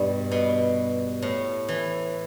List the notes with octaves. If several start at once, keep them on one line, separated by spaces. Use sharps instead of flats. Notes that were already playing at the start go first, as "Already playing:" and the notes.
Already playing: G2 B2 G3
B2
A2
E3